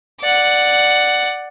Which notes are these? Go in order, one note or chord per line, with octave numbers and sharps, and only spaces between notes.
D5 F#5